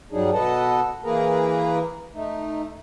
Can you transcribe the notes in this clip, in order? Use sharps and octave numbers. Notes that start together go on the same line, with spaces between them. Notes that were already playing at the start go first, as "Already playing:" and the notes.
G2 F#3 G3 D4 D#4 G#4
B2 A4 B4 D#5 F#5 A5
E3 A#3 G#4 A#4 B4 A#5
A3 D#4